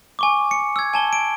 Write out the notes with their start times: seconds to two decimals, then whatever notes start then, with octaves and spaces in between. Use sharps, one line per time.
0.19 G#5 C#6 D6
0.51 C#7
0.76 E6 G#6
0.94 G#5 A5 G7
1.13 D7